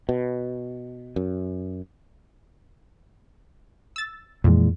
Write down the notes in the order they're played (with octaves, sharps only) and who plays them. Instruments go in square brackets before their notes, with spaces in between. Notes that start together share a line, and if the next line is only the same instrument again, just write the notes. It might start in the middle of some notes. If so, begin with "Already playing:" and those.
[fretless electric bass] B2
F#2
[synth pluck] E6 A6
[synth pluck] F2 [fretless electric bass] A#2 E3 G#3